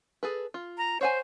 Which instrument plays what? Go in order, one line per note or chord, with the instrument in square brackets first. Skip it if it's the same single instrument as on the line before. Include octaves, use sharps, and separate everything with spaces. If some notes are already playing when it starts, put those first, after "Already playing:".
[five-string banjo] G#4 A4 B4
F4
[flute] A#5
[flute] C5 [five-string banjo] C#5 F#5 G#5